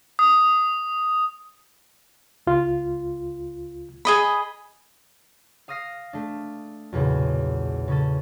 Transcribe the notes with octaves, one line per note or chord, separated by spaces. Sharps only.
D#6
C#2 F4
G#4 D#5 B5
F5 D#6 F6 A#6 C7
A3 D4
B1 E2 A#2 C#3
C#3 C#4 A4